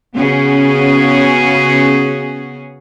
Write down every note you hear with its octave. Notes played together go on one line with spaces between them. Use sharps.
C#3 B3 C#4 F#4 G#4